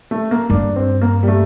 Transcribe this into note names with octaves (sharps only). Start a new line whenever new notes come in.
A3
A#3
G2 D4
C4
A#3
G3
A3